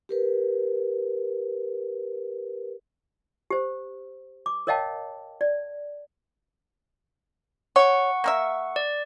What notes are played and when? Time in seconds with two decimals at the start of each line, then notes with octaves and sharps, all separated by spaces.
0.09 G4 A#4 B4
3.51 G4 C5
4.46 D6
4.67 A#4 C#5 D#5 F5 G5 A5
5.41 D5
7.76 C#5 F#5 C#6
8.24 A#3 A#4 E5
8.76 D5